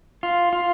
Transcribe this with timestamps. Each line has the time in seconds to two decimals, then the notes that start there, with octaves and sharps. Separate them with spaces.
0.23 F4
0.53 F4